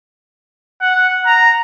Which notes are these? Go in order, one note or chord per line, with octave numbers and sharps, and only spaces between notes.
F#5
A#5